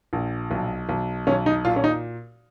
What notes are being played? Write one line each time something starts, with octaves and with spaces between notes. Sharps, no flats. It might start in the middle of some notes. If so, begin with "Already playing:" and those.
A#1
B1
B1
B1 C#4
D#4
A#2 F4
C#4
D#4